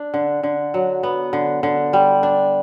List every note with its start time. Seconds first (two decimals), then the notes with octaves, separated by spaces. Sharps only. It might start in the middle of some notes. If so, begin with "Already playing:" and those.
Already playing: D4
0.14 D3
0.43 D3
0.74 F#3
1.03 B3
1.33 D3
1.63 D3
1.93 G3
2.23 D4